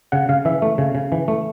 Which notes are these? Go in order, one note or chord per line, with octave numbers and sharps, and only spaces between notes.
C#3 F#5
C#3 F5
E3 E5
A3
C#3
C#3
E3
A3